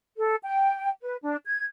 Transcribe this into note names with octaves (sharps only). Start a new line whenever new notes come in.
A4
G5
B4
D4
G#6